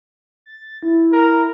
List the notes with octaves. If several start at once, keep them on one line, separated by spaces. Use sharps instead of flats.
A6
E4
A#4